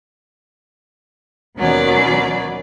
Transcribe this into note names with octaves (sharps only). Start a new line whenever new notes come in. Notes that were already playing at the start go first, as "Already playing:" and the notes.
D#2 B2 F#3 C#4 B4 D5